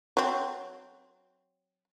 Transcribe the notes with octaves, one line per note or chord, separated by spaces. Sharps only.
F#3 C4